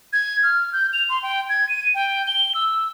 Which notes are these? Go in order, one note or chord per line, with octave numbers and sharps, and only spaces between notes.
G#6
F6
G6
F7
C6
G5
G#6
D#7
G5
G7
E6